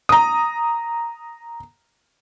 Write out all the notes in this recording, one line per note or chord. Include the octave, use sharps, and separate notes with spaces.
A#5 D#6